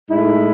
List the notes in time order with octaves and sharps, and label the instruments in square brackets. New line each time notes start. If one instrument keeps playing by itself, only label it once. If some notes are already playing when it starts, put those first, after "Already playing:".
[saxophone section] A2 G#3 D#4 E4